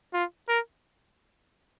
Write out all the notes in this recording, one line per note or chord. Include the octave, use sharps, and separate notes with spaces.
F4
A#4